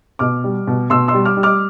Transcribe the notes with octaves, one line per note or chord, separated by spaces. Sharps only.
B2 D6 F6
G3
B2
B2 C6 E6
C6 E6
G3
D6 F6
G3
D6 F6